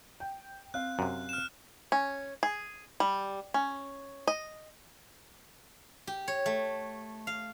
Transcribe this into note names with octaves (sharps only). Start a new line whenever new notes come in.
G5
C4 F5 F#6
F#2 C3
F6 E7
C#4
G#4
G3
C#4
D#5
G4
C#5
A3
F5